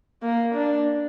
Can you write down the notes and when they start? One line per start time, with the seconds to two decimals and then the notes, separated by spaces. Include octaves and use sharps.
0.23 A#3
0.54 D4